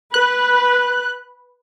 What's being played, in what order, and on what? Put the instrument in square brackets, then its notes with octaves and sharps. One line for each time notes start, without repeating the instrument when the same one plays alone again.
[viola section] B4 [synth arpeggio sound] F#6